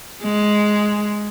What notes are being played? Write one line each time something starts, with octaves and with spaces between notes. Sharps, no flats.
G#3